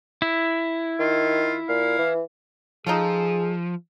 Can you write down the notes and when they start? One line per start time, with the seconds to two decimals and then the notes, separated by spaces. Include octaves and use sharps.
0.22 E4
0.99 D#3 F4
1.69 A#2 F5
1.98 E3
2.87 F3 D#4 F4 G#4 A4